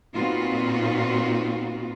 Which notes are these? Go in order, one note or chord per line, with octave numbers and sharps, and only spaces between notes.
A#2 B3 C4 D#4 F4 F#4